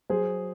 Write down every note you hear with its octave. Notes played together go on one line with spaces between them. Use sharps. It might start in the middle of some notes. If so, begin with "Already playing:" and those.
F#3 G#4 C5